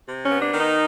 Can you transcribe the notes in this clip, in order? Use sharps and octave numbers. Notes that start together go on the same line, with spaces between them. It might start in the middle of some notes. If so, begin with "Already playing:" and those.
C3
C#4
B3
D4
D#3
D#4